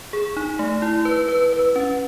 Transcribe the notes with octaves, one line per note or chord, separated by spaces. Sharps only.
G#4
D#4
A3
E4
B4
B4
B4
C#4